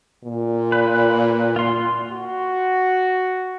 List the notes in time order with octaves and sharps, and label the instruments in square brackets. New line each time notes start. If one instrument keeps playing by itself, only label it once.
[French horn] A#2
[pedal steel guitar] B4
F4 C6
[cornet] F#4